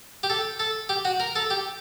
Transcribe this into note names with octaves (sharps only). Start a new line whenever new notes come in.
G4
A4
A4
G4
F#4
A#4
A4
G4